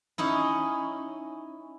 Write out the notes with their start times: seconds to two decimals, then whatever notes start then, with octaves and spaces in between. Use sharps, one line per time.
0.18 C#4 D#4 E4